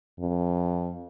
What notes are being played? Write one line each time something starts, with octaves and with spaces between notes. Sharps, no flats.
F2